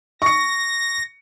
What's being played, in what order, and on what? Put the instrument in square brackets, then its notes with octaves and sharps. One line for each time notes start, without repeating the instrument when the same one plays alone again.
[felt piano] C#6 C#7 [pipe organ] A#6